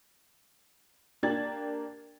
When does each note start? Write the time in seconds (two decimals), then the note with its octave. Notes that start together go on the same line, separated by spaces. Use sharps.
1.23 A#3 D4 G4 G#6 A6 F#7